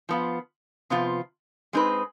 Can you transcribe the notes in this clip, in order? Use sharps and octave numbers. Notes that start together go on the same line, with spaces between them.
F3 B3 F4
C3 F3 B3 F4
G#3 C4 D#4 B4